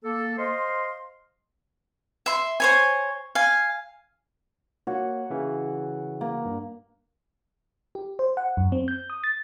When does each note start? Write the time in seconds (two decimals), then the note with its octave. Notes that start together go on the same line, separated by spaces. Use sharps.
0.04 A#3 A4
0.38 C5 D#5 F5 C6
2.26 E5 C6
2.60 C5 C#5 G#5
3.35 F5 G#5
4.87 A#3 F#4 C#5
5.30 C#3 E3
6.21 A#3
6.45 G2
7.95 G4
8.19 C5
8.37 F#5
8.57 F#2
8.72 C4
8.88 G6
9.10 D#6
9.24 A6